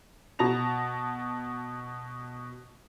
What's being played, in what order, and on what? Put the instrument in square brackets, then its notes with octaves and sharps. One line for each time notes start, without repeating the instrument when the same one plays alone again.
[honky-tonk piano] B2 A5 A#6 F7